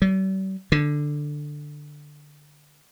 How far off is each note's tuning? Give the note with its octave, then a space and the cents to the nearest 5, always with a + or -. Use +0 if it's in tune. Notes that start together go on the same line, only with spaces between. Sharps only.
G3 -45
D3 +10